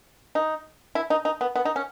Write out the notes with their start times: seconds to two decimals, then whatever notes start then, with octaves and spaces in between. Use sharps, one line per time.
0.35 D#4
0.95 E4
1.10 D#4
1.25 D#4
1.41 B3
1.56 B3
1.65 D#4
1.76 C#4